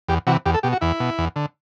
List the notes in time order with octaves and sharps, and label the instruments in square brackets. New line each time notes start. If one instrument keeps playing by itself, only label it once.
[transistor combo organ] E2 G4
C3 E3 F#4
E2 G4
A4
B2 G4
F#4
E2 E4
B2
E2
D3